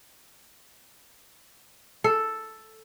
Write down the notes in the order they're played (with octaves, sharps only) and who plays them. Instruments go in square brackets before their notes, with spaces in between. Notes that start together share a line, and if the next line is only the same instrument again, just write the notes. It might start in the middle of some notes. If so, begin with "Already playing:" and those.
[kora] A4